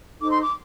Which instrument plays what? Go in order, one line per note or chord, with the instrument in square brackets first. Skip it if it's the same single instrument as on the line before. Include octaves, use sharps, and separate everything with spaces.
[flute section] D#4 A4 C5 D6
C6
D6